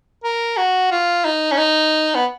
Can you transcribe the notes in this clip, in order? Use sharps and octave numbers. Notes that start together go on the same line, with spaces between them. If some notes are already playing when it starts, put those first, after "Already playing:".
A#4
F#4
F4
D#4
C#4
D#4
B3